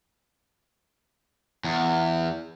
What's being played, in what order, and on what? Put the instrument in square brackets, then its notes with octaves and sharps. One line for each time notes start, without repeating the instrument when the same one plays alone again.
[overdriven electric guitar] E2